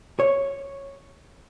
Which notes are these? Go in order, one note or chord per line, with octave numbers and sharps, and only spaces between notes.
C#5